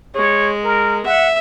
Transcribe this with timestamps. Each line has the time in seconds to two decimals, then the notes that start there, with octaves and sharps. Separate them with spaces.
0.15 G#3 C#5
0.64 A#4
1.06 E5 F#5